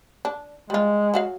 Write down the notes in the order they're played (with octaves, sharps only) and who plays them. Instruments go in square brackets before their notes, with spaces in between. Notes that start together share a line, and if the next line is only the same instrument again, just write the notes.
[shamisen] D4
[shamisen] G3 F4 [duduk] G#3
[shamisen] F#3 F#4 F5